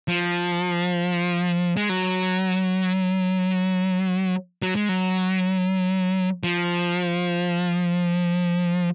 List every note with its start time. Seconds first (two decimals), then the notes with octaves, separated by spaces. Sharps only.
0.08 F3
1.77 G#3
1.89 F#3
4.62 F#3
4.76 G#3
4.89 F#3
6.44 F3